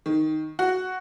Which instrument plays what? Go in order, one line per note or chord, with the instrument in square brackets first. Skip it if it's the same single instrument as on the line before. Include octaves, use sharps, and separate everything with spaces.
[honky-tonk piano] D#3
F#4